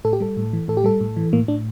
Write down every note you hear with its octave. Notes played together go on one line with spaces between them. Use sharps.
A2 A4
G4
G3 A4
A2
E3
A2 A4
G4
G3 A4
A2
E3
A2 A#3
A2 D4